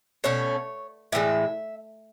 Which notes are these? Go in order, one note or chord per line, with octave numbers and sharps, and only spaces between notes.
B2 A3 C#4 C#5
A2 E3 G#3 E5